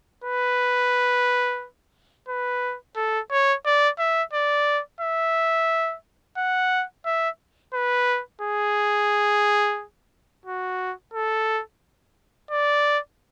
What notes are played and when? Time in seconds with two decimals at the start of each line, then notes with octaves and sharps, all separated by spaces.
0.24 B4
2.28 B4
2.96 A4
3.31 C#5
3.65 D5
3.99 E5
4.33 D5
5.01 E5
6.37 F#5
7.06 E5
7.74 B4
8.42 G#4
10.46 F#4
11.14 A4
12.51 D5